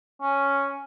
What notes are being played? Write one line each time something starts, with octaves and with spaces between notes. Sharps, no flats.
C#4